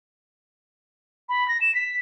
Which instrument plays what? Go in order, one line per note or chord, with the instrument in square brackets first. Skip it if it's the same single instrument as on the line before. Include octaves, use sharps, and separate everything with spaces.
[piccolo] B5
A#6
E7
B6